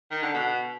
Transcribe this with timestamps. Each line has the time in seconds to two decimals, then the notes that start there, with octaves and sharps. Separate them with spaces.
0.11 D#3
0.23 D3
0.34 B2